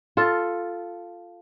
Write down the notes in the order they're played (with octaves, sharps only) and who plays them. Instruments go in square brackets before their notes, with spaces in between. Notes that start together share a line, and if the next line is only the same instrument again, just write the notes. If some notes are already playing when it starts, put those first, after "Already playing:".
[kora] F4 A4